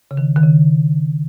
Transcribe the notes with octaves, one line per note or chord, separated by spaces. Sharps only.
C#3
D#3
D#3
C#3